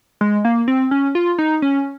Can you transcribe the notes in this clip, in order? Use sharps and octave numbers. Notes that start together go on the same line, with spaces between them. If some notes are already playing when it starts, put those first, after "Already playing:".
G#3
A#3
C4
C#4
F4
D#4
C#4